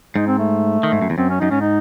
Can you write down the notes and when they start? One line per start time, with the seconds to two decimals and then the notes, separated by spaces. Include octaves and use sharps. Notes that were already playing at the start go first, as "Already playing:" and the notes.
0.16 G#2 D#4
0.27 C4
0.39 A3
0.83 D#3
0.92 G#2
1.02 F#2
1.10 E2
1.18 F#2 C4
1.30 C#4
1.40 F#2 D#4
1.51 G#2 C#4
1.61 D#4